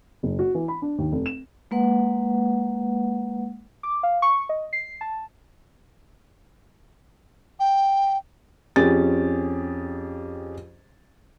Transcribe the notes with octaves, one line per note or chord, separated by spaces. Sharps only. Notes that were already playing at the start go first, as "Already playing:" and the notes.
F#1
F#4
E3
B5
D4
D#2
F1
E7
G#3 A#3 B4 F#5
D6
F5
C#6
D#5
C7
A5
G5
F2 C#4 G4 G#4 A6